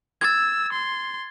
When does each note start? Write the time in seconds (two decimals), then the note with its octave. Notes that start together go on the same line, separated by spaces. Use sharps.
0.21 E6 G#6 A6
0.73 C6